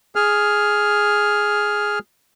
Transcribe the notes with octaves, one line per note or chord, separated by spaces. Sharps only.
G#4 F6